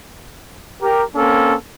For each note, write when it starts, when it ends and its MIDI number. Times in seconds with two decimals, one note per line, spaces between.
0.82 1.03 67
0.82 1.03 70
1.15 1.55 58
1.15 1.55 60
1.15 1.55 61
1.15 1.55 69